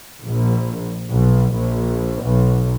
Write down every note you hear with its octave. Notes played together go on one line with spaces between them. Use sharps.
A#1
B1
A#1
B1